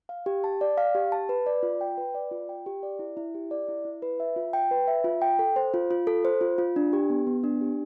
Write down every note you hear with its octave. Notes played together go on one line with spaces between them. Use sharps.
F5
G4
A5
D5
F5
G4
A5
B4
D5
F4
G5
B4
D5
F4
G5
G4
D5
E4
E4
G4
D5
E4
E4
B4
E5
F4
G5
B4
E5
F4
G5
A4
C5
F4
F4
A4
C5
F4
F4
D4
G4
B3
B3
D4
G4